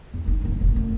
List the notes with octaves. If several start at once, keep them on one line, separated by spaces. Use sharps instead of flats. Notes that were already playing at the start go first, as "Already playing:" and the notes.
E2
F#1 D#4
D#1 F#2
F1 A2
F#2 A3